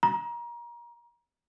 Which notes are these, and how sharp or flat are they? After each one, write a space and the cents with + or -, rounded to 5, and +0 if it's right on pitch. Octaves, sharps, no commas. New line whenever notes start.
A#5 +30